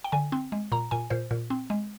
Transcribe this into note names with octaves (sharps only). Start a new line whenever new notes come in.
G5
D3 G#5
C4
G#3
A#2 A#5
A#2 G#5
A#2 C5
A#2
C4
G#3